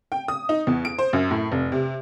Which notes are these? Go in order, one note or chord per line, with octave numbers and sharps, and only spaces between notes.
G5
D#6
D#4
E2
D7
C5
F#2
A2
F1
C3